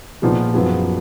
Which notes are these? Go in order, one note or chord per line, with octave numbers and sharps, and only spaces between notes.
A#2 F3 B3 D#4 G#4
F#2 F3 B3 F4 G#4